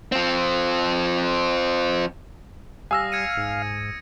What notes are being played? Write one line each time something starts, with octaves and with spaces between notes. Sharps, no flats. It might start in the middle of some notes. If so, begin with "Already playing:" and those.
F3 C4
G3 F5 G#5 D#6 E6 A#6
G#6 C#7 D#7
G#2